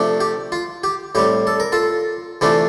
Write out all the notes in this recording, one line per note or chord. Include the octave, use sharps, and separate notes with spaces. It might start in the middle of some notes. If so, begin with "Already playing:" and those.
Already playing: C3 F3 A3 D4
G4
F4
G4
A2 G3 C4 G4
A4
A#4
F4 A4
C3 E3 A3 D4 F4